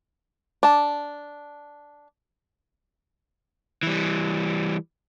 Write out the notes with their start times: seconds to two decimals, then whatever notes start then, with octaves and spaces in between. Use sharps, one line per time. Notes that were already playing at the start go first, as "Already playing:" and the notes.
0.63 D4 A5
3.83 E3 G3